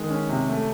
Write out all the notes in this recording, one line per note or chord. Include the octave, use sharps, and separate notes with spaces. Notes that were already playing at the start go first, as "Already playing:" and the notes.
Already playing: D#3 G#3
C#4
C3
A3